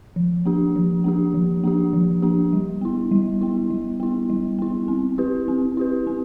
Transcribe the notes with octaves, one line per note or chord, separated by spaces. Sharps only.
F3
A#3 D4 G4
F3
A#3 D4 G4
F3
A#3 D4 G4
F3
A#3 D4 G4
G3
B3 E4
G3
B3 E4
G3
B3 E4
G3
B3 E4
C4
E4 G4 B4
C4
E4 G4 B4
C4